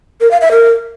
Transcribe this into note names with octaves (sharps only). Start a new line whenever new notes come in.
A#4
F5
E5
A#4